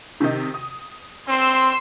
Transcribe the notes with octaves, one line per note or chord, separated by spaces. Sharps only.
C3 D#3 D#4
D#6
C4 C6 E6